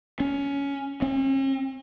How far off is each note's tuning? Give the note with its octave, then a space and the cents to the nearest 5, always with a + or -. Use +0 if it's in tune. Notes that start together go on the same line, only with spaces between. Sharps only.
C#4 +15
C#4 -45